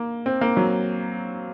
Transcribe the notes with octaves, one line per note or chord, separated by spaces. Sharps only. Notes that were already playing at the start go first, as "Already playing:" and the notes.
Already playing: A#3
C4
A#3
F#3